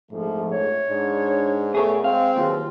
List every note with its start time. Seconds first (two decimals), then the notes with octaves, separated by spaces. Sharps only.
0.12 A#1 F2 G#2 F3 A3
0.52 C#5
0.89 G#2 D4
1.75 A#2 A3 B3 G#4 C#5
2.04 G#3 C4 F5
2.36 D#2 E3 F#3 F4 G#4